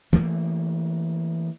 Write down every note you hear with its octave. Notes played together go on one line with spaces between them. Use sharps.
E3 A3 A#3